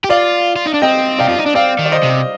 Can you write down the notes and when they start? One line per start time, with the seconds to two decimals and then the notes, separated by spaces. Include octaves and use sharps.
0.04 G4
0.10 F4 D5 F5
0.56 F4
0.66 D#4
0.74 D4
0.82 C4 D#5 G5
1.19 G4 D5 F5
1.28 F4
1.38 D#4
1.46 D4
1.55 C4 D5 F5
1.79 D#3
1.86 D5
1.92 C5 D#5
2.03 C3